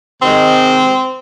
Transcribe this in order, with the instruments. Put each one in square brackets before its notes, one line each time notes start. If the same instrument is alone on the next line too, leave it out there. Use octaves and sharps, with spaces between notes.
[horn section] C3 D#3 G#3 C4